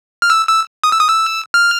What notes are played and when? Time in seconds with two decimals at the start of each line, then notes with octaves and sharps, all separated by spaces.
0.22 F6
0.30 E6
0.48 E6
0.84 D#6
0.92 E6
1.01 D#6
1.09 E6
1.54 F6